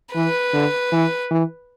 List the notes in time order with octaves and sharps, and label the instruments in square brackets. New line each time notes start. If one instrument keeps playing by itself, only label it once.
[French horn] E3 [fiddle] B4
[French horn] D3
E3
E3